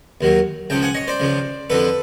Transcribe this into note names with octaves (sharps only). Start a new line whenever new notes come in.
D#2 D#3 F#3
C#2 C#3 F3 G5 A5
F#5 G#5
C#5 D#5
C5 D5
C#2 C#3 F3
F2 D3 F3 A4 B4